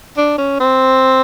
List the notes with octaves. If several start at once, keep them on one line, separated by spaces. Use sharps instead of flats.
D4
C#4
C4